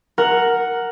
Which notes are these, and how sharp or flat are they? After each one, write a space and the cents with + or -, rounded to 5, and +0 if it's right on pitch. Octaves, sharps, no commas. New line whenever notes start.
A#4 +0 F#5 +0